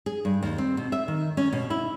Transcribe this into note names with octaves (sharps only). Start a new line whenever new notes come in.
G#4
G2
D#2
C4
B2
E5
D#3
C#4
B2
E4